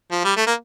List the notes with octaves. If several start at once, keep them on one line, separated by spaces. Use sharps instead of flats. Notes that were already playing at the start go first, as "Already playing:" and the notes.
F3
G3
A3
A#3